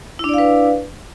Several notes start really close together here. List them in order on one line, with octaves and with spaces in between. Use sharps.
E4 D4 D5 F5 B4